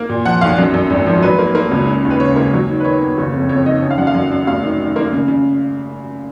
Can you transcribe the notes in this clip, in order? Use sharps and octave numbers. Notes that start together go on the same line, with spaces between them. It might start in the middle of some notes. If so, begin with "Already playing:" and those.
Already playing: A#3
A#2
F3 F#5
B1 F5
F#2
F#2
G#1
F3
F#3 B4
A#3
A#3
C#2
C#3
D#2
B4
C#3 C#5
A#3
F#3
D#3
B4
D#3 C#5
B3
F#1
F2
F2 C#5
D#3 D#5
C#3 C#5
F5
F#2 F#5
F5
F#2
F#2
F1 F5
D#3
D#3
A#3
C#3
C#3